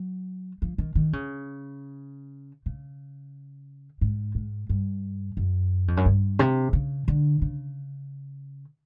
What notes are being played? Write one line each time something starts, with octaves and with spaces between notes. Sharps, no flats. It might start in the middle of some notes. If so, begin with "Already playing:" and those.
Already playing: F#3
F3
D#3
D#3
C#3
C#3
G#2
G#2
G2
F#2
F2
F#2
G2
C3
C#3
D3
C#3